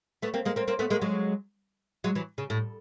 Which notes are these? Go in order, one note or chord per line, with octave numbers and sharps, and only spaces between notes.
A3 B3
A#3 C4
G#3 A#3
A#3 C4
A#3 C4
A3 B3
G#3 A#3
F#3 G#3
F#3 G#3
E3 F#3
C#3
A2